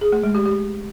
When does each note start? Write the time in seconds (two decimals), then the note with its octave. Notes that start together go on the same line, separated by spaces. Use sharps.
0.01 G#4
0.12 A3
0.24 G#3
0.35 G4
0.46 G4